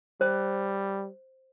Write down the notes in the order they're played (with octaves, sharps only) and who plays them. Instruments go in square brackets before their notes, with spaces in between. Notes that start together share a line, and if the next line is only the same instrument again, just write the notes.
[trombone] G3 [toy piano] C5